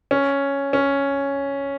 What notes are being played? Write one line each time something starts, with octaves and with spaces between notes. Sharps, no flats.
C#4
C#4